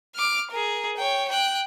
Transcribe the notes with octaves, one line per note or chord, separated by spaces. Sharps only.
D6 F6
G#4 A#4
C#5 G5
G5 F#6